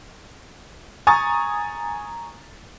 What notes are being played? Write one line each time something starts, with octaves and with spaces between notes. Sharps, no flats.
G#5 A#5 C#6 D#6 A6